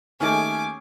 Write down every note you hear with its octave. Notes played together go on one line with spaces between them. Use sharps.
D#2 D#3 A3 C#4 G#4 G#5 D6